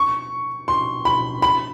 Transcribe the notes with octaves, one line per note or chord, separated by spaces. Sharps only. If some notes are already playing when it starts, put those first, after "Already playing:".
Already playing: C#6
C6
B5
B5